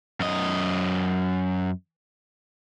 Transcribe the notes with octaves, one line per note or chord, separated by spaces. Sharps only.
F#2 D#5